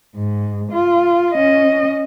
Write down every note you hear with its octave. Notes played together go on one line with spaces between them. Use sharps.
G#2
F4
C#4 D#5